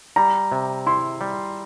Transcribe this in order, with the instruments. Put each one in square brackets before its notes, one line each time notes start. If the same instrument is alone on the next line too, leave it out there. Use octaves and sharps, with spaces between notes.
[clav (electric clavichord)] G3 [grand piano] A#5
[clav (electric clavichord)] C3
[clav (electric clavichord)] E4 [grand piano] C6
[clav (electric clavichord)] G3